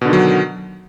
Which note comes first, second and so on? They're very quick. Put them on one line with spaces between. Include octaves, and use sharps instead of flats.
B2 D3 D#3 F#3